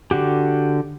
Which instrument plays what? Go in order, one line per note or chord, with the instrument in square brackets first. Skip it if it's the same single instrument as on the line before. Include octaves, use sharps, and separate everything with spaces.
[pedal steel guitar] D3 F#4 G4